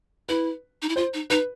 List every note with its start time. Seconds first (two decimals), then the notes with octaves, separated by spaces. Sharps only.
0.29 E4 B4
0.82 D#4
0.89 E4
0.96 F4 C5
1.14 D#4
1.30 D#4 B4